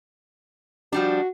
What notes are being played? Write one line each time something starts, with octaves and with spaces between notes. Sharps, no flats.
F3 G3 D4 F#4